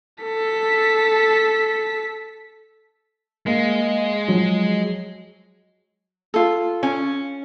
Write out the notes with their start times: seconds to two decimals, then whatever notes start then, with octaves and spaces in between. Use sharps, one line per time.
0.23 A4 B6
3.46 G#3 A#3
4.28 F3 F#3
6.34 F4 A4
6.83 C#4